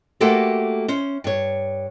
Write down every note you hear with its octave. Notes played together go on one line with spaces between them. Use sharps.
A3 A#3 F#4 G4 A4 C5
C#4 C5
G2 C#5